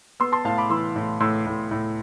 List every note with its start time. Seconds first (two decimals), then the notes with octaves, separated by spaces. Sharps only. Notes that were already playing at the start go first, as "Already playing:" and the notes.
0.20 B3 C6 E6
0.32 A5 C6
0.45 A2 F5 A5
0.58 B5 D6
0.70 E3 C6 E6
0.96 A2
1.20 A2 C6 E6
1.46 A2
1.71 A2